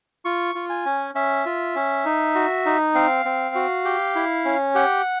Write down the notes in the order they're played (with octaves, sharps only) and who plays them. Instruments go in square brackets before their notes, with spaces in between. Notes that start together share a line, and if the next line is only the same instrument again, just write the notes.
[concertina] F4 C#6
F4
G#5
C#4
C#4 E5
F4
C#4
D#4
F#4
D#4
C4 F5
C4
F#4
G4
E4
C#4
G4 F#5